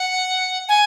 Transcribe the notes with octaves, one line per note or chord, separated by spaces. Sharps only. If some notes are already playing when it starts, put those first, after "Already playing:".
Already playing: F#5
G#5